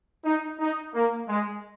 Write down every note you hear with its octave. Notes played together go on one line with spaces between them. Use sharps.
D#4
D#4
A#3
G#3